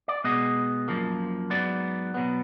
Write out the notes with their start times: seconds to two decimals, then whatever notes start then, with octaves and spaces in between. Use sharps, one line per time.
0.08 D5
0.24 B2 G#3 B3 D#5
0.88 F#2 F3 A#3
1.50 G#2 F#3 B3 D5
2.14 B2 F#3 B3